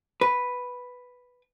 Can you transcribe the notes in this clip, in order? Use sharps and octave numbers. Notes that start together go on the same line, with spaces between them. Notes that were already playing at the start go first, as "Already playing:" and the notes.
B4